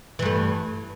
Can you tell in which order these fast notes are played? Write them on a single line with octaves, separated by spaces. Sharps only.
E3 G2 A3